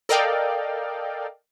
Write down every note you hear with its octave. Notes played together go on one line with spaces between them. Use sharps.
A4 A#4 D5 D#5 F5 G5